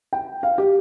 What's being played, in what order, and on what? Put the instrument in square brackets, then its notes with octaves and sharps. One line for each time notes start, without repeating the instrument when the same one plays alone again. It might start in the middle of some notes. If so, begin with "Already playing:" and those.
[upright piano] G5
F5
G4